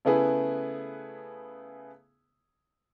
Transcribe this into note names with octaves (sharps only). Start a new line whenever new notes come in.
C#3 A3 B3 E4 G#4 B4